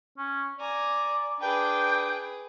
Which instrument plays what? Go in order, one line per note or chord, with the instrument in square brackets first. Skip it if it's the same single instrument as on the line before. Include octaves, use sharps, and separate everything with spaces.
[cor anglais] C#4
[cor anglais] D5 [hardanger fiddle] G#5 A#5
[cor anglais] D4 [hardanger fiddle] G#4 B4 [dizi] G5